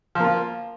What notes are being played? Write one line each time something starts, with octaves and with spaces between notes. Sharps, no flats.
F3 A#3 F4